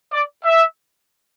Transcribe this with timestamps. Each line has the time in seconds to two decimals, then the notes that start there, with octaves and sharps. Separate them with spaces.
0.12 D5
0.44 E5